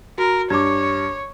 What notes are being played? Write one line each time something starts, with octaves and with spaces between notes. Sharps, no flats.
F#4 A#4
G2 C#5 D6 G#6